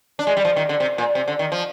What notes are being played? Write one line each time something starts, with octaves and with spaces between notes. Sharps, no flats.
D4
G#3
G3
F3
D#3
D3
C3
A#2
C3
D3
D#3
F3